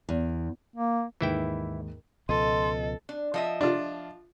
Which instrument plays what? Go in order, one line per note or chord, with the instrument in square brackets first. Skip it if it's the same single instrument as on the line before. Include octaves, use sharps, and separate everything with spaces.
[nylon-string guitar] E2
[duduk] A#3
[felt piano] D#2 G#2 [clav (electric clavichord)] E3 E4 G5
[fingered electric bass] C#2 B2 F3 [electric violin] A4 [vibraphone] D#5 [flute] C6
[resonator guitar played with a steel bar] D4
F3 D#5 E5
[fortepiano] D4 F4